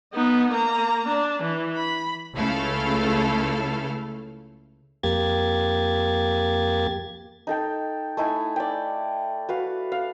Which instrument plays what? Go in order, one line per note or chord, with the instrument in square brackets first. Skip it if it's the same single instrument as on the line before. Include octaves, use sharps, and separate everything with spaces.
[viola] B3 D#4
A#3 A#5
D4
E3
B5
[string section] C#2 C#3 A3 E4 A4 F5
[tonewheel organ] F2 A#3 G4 G#6 A6
[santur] D#4 A4 G5
A3 D#4 E4 G#5
D5 G5
F#4 B4 F5
F5